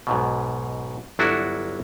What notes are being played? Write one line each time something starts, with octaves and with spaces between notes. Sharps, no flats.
B1 G#2 B2
G1 F#3 D4 E4 F#4 A4